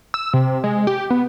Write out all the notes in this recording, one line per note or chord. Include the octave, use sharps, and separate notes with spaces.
E6
C3
G#3
G4
B3